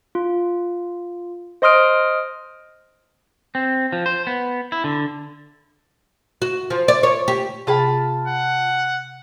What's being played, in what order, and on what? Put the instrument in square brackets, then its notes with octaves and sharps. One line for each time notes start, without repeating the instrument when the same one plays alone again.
[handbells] F4
C5 D#5 C6 D#6 F6 D7
[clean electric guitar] C4
F3
C5
B3
E4
D3
[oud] F#4
F3
D5
C#5
G4
[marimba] C3 G#4 G5 [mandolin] F4 A5 B5
[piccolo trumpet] F#5